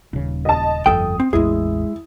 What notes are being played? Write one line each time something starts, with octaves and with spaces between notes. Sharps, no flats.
D#1 C#3
D#5 A5
G1 F2 A4 G5 D#6
C4
A1 E2 G#3 E4 G#4